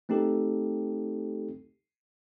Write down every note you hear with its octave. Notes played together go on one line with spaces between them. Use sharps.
A3 C4 D#4 G4 A4